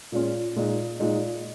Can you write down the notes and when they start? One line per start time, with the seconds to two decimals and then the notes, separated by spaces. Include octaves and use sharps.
0.12 A#2 G#3 C#4 F4
0.56 A#2 G#3 D#4
0.99 A#2 G#3 D#4